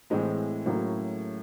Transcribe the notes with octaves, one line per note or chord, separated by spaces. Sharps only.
A2 E3 G#3 C4
A2 F#3 A#3 C#4